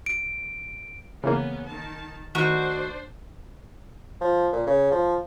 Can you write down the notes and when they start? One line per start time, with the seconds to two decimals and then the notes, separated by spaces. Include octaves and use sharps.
0.06 D7
1.24 C#3 E3 A#3 B3 C#4
1.66 D#3 A5
2.35 D#3 A3 D4 F#4 C5
4.21 F3
4.53 A#2
4.67 C#3
4.92 F3